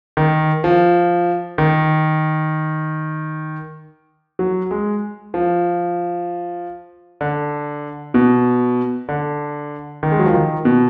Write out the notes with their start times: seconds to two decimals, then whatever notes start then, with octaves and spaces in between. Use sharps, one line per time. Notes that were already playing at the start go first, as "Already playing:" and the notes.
0.17 D#3
0.64 F3
1.58 D#3
4.39 F#3
4.71 G#3
5.34 F3
7.21 D3
8.14 B2
9.09 D3
10.03 D#3
10.12 G#3
10.19 F#3
10.26 F3
10.34 D#3
10.65 B2